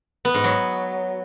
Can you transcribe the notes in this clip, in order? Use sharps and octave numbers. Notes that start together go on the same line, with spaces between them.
B3
G#2
F#3